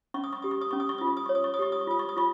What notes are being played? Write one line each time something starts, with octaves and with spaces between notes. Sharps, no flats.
C#4 C#6
D#6
C#6
G4 D#6
C#6
D#6
C#4 C#6
D#6
C#6
F4 D#6
C#6
D#6
C#5 C#6
D#6
C#6
D#6
G4 C#6
D#6
C#6
F4 D#6
C#6
D#6
F4 C#6